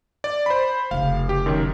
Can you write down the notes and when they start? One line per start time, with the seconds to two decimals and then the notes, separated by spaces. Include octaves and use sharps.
0.24 D5
0.46 C5 B5
0.91 F1 C#3 F5
1.29 G4
1.46 F#2 D#3